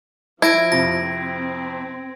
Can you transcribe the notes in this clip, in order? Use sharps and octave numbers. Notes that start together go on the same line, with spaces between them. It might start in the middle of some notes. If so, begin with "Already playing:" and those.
F3 E4 G#6 A#6 D7
F2 C3 A#6
C4